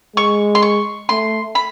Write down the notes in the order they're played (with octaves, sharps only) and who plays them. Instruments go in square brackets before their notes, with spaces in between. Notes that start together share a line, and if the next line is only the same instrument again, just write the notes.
[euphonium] G#3 [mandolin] C#6
[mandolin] C6
C#6
[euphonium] A3 [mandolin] C6
[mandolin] B5